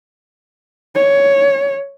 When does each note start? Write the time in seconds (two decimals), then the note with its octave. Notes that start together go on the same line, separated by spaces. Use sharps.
0.95 C#5